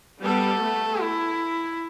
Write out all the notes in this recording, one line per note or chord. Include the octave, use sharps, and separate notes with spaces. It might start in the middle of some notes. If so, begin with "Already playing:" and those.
G3 B3 A4
A3
E4